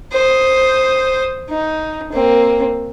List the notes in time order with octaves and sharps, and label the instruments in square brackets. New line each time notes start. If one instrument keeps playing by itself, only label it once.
[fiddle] C5 D#6
D#4
A#3 C4